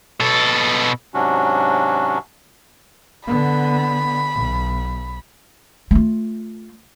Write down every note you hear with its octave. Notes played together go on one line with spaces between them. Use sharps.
B2 A4
G#2 C3 F#3 C#4 D4 F#4
D3 B3 B5
B1
A3 F4